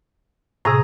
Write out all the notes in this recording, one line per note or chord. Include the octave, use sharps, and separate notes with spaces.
A2 C3 G#4 A#5